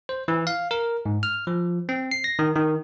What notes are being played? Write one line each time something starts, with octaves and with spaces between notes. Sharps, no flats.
C5
E3
F5
A#4
G#2
F6
F3
C4
C7
A#6
D#3
D#3